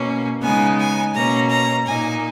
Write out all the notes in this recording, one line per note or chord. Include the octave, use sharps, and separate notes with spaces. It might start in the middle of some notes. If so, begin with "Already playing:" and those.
Already playing: B2 A#3 C#4
C#3 G#3 B3 D#4 G#5
G#5
B2 A#3 C#4 A#5
A#5
A#2 A#3 D#4 G#5